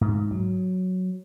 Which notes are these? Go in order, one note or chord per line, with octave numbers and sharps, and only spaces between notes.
G#2
F#3